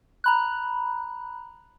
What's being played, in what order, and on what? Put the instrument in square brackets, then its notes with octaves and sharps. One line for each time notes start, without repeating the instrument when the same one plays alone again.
[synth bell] A#5 B5 F#6